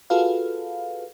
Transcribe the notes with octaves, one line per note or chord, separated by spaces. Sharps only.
F4 F#4 G#4 A4 B4 F5